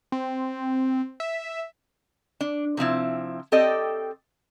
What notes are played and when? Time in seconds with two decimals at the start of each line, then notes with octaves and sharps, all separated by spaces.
0.12 C4
1.20 E5
2.41 D4
2.77 C3 F3 C4 E4
3.52 C4 G4 A4 D5 D#5